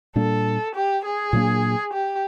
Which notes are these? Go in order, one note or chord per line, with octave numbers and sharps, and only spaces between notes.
A#2 G3 A#3 D4 A4
G4
G#4
A#2 F#3 A#3 D4
G4